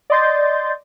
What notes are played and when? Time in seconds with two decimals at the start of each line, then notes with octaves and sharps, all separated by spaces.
0.10 D5 D#5 C6 G6 A6